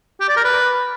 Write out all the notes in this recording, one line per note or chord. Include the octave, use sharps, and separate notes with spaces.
G4
D5
A#4
B4